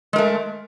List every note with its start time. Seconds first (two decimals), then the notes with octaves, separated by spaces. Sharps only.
0.13 G#3
0.16 A#4
0.18 A3